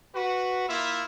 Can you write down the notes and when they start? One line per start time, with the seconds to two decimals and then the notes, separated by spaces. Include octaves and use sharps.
0.15 F#4 B4
0.68 A#3 E4 F4 E5